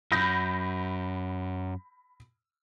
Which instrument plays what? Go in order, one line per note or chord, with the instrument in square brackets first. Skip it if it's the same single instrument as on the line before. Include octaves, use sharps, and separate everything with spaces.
[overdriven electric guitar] F#2 [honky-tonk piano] B5 G6 A#6